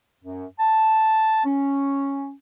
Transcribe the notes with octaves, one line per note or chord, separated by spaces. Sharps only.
F#2
A5
C#4